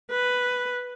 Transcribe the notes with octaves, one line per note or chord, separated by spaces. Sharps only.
B4